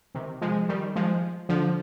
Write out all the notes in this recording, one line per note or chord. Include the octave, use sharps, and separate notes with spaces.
C3 D#3
F3 G#3
D#3 G3
F3 G#3
D3 F3